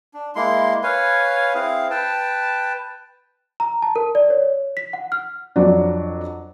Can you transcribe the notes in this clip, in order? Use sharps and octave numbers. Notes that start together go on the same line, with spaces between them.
D4
G#3 A#3 E4 C6
B4 C#5 F5 G#5
C4 E4 G#4 F5
B4 G5 A5
A#5
A5
A#4
D5
C#5
B6
F#5
F6
F2 F#3 D4